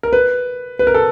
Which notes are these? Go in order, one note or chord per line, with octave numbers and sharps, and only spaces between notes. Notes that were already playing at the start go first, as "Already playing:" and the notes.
A#4
B4
B4
A#4
A4